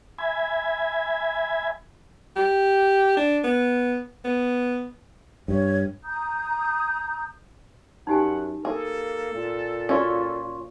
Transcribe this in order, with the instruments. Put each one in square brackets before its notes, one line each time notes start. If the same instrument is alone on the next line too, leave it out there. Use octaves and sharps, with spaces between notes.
[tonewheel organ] E5 G#5 B5 G#6
[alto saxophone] G4
D4
B3
B3
[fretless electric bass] G2 [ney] C#5
[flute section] A#5 D#6 G6
[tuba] F#2 [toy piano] D#4 G4 G#5 [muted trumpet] F#5
[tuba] A#3 [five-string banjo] G#4 [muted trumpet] A4
[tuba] A#2
[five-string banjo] C#4 F4 [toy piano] F#4 D5